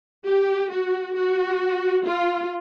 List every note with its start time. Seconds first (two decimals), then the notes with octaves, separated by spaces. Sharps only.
0.27 G4
0.72 F#4
1.17 F#4
2.06 F4